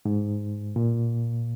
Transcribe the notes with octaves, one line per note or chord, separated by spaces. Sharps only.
G#2
A#2